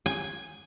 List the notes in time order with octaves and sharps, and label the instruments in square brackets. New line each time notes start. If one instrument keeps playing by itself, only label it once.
[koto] G#5